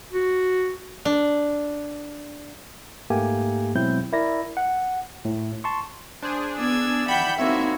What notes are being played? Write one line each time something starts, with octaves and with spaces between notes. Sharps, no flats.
F#4
D4
G#2 A3 A#3 G4 G#5
B2 F#3 G#3 C4 E4 G6
E4 A#4 D5 A#6
F#5
A2
A5 C6 C#6
D4 G#4 C5
B3 D5 E6 G#6
E5 F#5 G5 B5 G6
G#3 A#3 C4 D#4 E4 F#4 C#5 E5